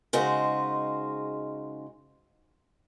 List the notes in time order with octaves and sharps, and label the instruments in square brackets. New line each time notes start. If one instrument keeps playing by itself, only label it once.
[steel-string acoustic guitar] C#3 G#3 D#4 F#4 C5